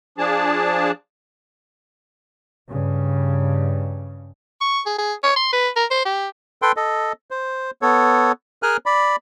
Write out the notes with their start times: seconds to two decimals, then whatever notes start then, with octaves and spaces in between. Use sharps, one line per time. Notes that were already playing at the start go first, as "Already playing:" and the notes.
0.18 F3 D4 G#4 A5
2.69 G2 C#3
4.61 C#6
4.86 G#4
4.98 G#4
5.24 C#5
5.36 C6
5.53 B4
5.76 A#4
5.91 C5
6.05 G4
6.62 A4 B4 G5 C6
6.77 A4 D#5
7.31 C5
7.82 B3 A4 C#5
8.63 G#4 A#4 G#5 F6 F#6
8.86 D5 B5